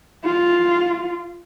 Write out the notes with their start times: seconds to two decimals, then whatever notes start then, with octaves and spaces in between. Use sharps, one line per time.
0.24 F4